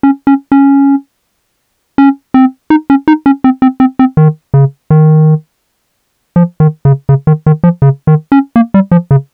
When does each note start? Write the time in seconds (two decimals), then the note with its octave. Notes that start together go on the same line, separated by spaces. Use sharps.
0.03 C#4
0.27 C#4
0.52 C#4
1.98 C#4
2.34 C4
2.70 D#4
2.90 C#4
3.08 D#4
3.26 C#4
3.44 C4
3.62 C4
3.80 C4
3.99 C4
4.17 D#3
4.54 C#3
4.90 D#3
6.36 F3
6.60 D#3
6.85 C#3
7.09 C#3
7.27 D#3
7.46 D#3
7.64 F3
7.82 C#3
8.07 D#3
8.32 C#4
8.56 A#3
8.74 G3
8.91 F3
9.11 C#3